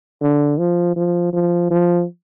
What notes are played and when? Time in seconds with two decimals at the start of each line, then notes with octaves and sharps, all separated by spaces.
0.21 D3
0.58 F3
0.96 F3
1.33 F3
1.70 F3